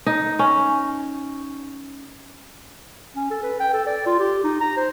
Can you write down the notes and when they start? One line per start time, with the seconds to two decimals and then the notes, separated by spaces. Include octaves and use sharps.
0.06 D#4
0.39 C#4
3.16 C#4
3.31 A4
3.43 B4
3.60 G5
3.73 A4
3.86 D5
4.06 F4
4.19 G4
4.44 D#4
4.61 A#5
4.77 C5